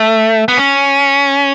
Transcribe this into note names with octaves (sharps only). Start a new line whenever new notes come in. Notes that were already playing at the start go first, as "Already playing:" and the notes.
Already playing: A3
B3
C#4